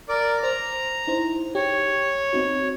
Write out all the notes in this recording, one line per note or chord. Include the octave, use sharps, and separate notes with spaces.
A#4 D5 D6
C5 A#5
D#4 E4 C5
G4 C#5
C4 D#4 F#4